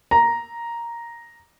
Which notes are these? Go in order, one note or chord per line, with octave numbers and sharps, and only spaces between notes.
A#5